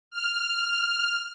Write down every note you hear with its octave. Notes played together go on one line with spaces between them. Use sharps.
F6